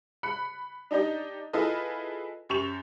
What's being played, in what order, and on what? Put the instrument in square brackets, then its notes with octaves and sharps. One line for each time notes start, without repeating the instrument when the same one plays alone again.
[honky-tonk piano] B5 F#6 C#7
D4 D#4 G4 D5 D#5
E4 F4 G#4 A4 B4 D#5
F#2 G4 C#6 E7 F7